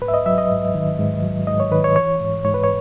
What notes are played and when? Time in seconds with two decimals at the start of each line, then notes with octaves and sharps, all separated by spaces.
0.02 G#2 B4
0.08 E5
0.14 D#5
0.26 F#3 E5
0.38 D#5
0.50 G#2
0.74 D#3
0.99 G#2
1.23 F#3
1.47 G#2 D#5
1.60 C#5
1.72 D#3 B4
1.84 C#5
1.96 E3 C#5
2.20 G#2
2.45 G#2 C#5
2.54 B4
2.64 C#5